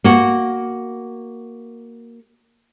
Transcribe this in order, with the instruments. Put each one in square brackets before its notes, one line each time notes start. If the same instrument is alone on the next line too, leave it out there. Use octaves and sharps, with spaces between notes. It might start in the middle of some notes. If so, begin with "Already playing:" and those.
[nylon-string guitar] A#3 F#4